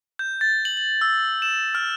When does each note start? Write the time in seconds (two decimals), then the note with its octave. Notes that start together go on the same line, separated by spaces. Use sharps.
0.19 G6
0.41 A6
0.65 F#7
0.77 F#7
1.01 E6
1.42 E7
1.75 F6